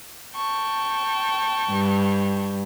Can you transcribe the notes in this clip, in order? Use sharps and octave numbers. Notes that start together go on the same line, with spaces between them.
G5 A5 C#6
G2